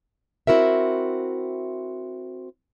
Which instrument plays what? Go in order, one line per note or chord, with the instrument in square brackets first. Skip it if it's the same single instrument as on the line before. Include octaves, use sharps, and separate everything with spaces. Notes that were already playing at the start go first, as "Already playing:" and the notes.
[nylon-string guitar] C4 E4 F#4 A#4 E5